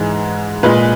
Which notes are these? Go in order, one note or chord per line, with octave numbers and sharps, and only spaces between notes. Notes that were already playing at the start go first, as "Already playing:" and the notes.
Already playing: G#2 E3 G#3
A#2 G#3 B4